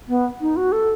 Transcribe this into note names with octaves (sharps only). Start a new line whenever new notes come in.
B3
D#4
F#4
A4